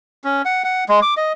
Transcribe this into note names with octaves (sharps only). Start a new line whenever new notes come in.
C#4
F#5
F#5
G#3
D6
D#5